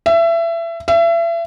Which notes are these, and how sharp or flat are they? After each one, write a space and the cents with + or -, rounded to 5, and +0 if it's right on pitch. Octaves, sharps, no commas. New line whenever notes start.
E5 +25
E5 +35